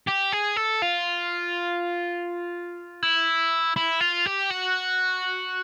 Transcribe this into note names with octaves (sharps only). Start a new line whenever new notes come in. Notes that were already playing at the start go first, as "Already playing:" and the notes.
G4
G#4
A4
F4
E4
E4
F4
G4
F#4